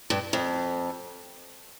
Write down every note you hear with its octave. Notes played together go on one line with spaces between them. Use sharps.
G2
F2